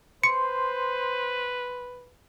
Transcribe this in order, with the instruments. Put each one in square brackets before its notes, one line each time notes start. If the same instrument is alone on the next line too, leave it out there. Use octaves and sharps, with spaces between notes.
[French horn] B4 [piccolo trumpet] C5 [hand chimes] C6 [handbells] C#7